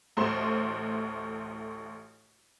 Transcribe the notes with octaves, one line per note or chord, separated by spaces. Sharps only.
A1 D2 A2 A3 C5 C6